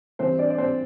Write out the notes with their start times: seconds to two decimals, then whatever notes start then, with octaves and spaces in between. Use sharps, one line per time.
0.19 G2 E3 C4 C5
0.39 D4 D5
0.50 D5
0.58 C4 C5